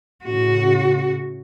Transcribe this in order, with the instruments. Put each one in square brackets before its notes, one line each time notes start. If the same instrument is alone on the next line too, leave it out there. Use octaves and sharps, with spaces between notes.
[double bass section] A2 C#3 [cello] F#4